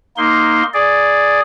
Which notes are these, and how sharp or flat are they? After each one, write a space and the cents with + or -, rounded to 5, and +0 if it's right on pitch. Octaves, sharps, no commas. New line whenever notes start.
A#3 +0 D#4 +5 C6 +0
G#4 +0 D5 +0